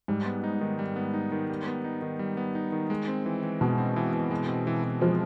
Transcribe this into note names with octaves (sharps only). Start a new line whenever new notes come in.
G#2 G3
B3
D#4
D#3
G3
B3
D#4
D#3
G3
B3
D#4
D#3
G3
B3
D#4
D#3
G#3
C4
E3
E3
B2 G#3
C4
E3
E3
G#3
C4
E3
E3
F3 G#3